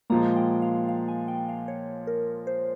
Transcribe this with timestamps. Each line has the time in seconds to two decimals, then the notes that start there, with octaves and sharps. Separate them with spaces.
0.10 A#2 F3 G#3 A#5
0.36 G5
0.62 F5
0.89 F5
1.08 G#5
1.28 G5
1.49 F5
1.68 C#5
2.07 A#4
2.47 C5